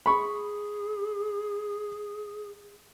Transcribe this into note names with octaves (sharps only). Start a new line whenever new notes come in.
G#4 B5 C#6